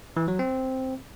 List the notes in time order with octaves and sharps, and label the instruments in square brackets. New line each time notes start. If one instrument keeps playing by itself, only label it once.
[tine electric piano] E3
F#3
C4